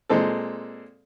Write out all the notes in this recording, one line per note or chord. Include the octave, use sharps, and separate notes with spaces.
A#2 G#3 C4 A4